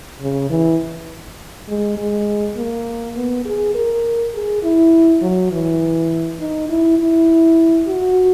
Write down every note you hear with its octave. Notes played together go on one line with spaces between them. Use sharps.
C#3
E3
G#3
G#3
A#3
B3
G#4
A#4
G#4
E4
F#3
E3
D#4
E4
E4
F#4